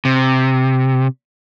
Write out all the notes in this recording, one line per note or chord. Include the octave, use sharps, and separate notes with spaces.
C3